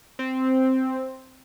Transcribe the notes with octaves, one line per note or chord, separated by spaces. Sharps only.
C4